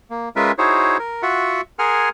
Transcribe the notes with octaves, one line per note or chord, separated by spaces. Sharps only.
A#3
G#3 C#4 F4 A#4 B4 E5
D#4 E4 F#4 G#4 C5 C#5
A#4
F4 F#4 E5 F#5
G#4 A#4 F#5 G#5 C6 F6